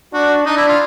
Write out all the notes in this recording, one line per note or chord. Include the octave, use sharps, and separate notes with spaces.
D4 F#4
D4 D#4
E4
F4